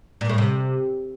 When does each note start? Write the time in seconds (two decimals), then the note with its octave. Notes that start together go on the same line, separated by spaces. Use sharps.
0.21 A#2
0.29 A2
0.38 C3